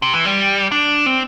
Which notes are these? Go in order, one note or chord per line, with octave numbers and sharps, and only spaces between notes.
C3
E3
G3
D4
C4